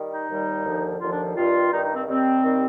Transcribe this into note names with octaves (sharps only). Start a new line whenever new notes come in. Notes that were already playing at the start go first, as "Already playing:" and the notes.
Already playing: D#3 G3
D#4
D#2 D#3 G3
D#2 D3 F3
D#2 D3 F3 F4
D4
G2 D#3 G3 F4
G2 D#3 G3 D#4
D#4
C4
D#2 D#3 G3 C4
D#2 D#3 G3